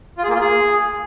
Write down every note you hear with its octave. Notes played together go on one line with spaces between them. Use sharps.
F4
G#4
A#3
F4
G#4